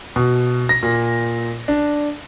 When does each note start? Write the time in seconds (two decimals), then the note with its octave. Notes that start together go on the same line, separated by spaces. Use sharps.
0.16 B2
0.69 A#6
0.83 A#2
1.68 D4